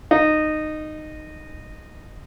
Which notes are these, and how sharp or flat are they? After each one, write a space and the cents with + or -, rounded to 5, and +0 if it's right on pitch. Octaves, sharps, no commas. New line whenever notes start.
D#4 -15